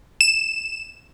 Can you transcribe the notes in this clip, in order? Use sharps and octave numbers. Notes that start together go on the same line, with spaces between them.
E7